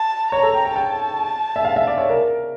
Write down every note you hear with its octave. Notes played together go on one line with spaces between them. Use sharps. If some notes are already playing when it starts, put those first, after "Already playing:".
Already playing: A5
C#5 A#5
A4
G5
G5
G5 A5
E5
F5
E5
D5
C#5
A#4